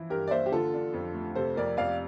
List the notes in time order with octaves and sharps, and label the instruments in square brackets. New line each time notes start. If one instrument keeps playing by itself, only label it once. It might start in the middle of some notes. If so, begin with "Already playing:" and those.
Already playing: [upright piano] E3 F3 E4
[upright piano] G2 [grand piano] G4 A#4
[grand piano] D5
[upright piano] A#3 [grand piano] C5 E5
[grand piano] G4
[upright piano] D3 [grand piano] F4 A4
[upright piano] D4
F2
A3
[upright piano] C3 [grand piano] A4 C5
[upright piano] F2 [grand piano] A#4 D5
[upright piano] F2 [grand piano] D5 F5